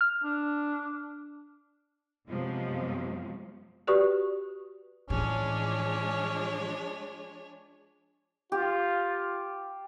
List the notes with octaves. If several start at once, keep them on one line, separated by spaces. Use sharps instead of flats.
F6
D4
F#2 C3 F3 F#3 G#3 B3
F#4 G4 B4 D5 C#6 D#6
A2 E3 F3 G#3 C#4 D4 C#5 G#5
F4 G4